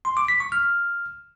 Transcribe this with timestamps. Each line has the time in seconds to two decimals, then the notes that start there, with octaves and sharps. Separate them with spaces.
0.05 C6
0.17 D6
0.28 B6
0.40 C#6
0.52 F6